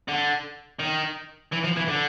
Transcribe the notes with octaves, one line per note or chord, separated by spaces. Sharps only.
D3
D#3
E3
F3
E3
D3